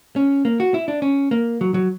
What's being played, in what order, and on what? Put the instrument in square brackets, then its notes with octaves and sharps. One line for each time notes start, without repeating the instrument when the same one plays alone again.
[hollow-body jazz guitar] C#4
A#3
F#4
E4
D4
C#4
A#3
F#3
F#3